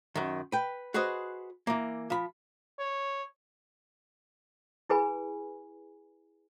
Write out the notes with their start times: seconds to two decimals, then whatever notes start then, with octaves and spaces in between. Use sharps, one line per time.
0.15 F#2 D#3
0.52 B4 G5
0.94 F#4 G#4 B4 C5 D#5
1.67 E3 A#3
2.10 F3 B5
2.79 C#5
4.89 E4 G#4 B4 G#5 B5